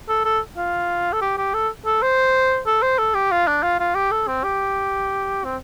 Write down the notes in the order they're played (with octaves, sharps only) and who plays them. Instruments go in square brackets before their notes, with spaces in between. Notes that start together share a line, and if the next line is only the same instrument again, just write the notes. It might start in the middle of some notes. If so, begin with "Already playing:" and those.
[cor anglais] A4
A4
F4
A4
G4
G4
A4
A4
C5
A4
C5
A4
G4
F4
D4
F4
F4
G4
A4
C4
G4
C4